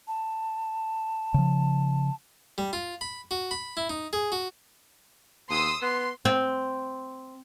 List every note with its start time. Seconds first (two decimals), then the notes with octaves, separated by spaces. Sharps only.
0.08 A5
1.34 C#3 F3
2.58 G3
2.73 F4
3.01 B5
3.31 F#4
3.51 B5
3.77 E4
3.90 D#4
4.13 G#4
4.32 F#4
5.50 D#2 C6 D#6 E6
5.82 B3 C6
6.25 C4